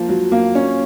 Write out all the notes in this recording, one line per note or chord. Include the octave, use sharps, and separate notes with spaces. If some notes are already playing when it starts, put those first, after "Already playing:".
Already playing: F3 A#3
F#3
A#3
C#4